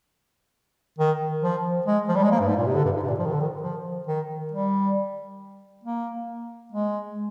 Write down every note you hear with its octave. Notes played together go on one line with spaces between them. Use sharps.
D#3
F3
G#3
F3
G3
G#3
A#3
G2
G#2
A#2
C3
D3
G2
G#2
C3
A#2
F3
D#3
D3
D#3
F3
D#3
G3
A#3
G#3